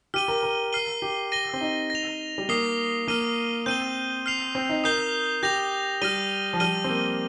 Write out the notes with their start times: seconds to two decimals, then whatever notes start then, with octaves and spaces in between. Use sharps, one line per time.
0.14 G4 F6 D#7 G7
0.28 A#4
0.43 A#4
0.73 F6 C7 D#7 G7
1.02 G4
1.32 A#6 D#7 G7
1.53 C4
1.61 D#4
1.90 A#6 F7
2.38 G3
2.49 A#3 D#6 C7 G7
3.08 A#3 F6 D#7 G7
3.66 C4 G6 D#7 G7
4.26 F6 C7 F7
4.55 C4
4.69 D#4
4.84 A#4 D#6 G6 C7 G7
5.43 G4 G6 A#6 F7
6.01 G3 F6 A#6 D#7 G7
6.53 F3
6.60 G3 F6 D#7 G7
6.84 C4
6.89 A#3